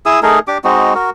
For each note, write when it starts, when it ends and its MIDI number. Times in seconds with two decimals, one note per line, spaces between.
0.06 0.20 64
0.06 0.20 68
0.06 0.20 87
0.06 0.20 88
0.23 0.39 57
0.23 0.39 63
0.23 0.39 68
0.23 0.39 70
0.48 0.58 62
0.48 0.58 67
0.48 0.58 86
0.64 0.94 56
0.64 0.94 60
0.64 0.94 63
0.64 0.94 66
0.95 1.10 66
0.95 1.10 70